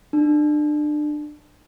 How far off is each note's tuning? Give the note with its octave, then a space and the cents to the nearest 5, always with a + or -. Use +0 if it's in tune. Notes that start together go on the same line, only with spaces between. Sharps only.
D4 +30